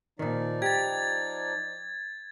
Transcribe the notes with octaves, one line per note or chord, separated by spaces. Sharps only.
A#2 D#3 F3 D#4 D5
G4 G#6 A6